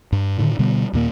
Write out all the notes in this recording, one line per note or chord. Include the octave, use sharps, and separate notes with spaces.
G2
A2 D3 D#3
B2 D3 G3 B3
D#2 A#2 A#3